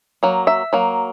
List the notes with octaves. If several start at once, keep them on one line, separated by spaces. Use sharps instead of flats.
F#3 A#3
E5
F#3 A#3